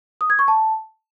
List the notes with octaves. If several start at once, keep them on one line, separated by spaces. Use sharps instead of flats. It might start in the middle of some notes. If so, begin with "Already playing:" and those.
D#6
G#6
C#6
A5